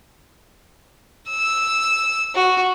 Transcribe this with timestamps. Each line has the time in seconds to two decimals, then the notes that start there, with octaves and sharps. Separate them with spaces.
1.30 E6
2.35 F#4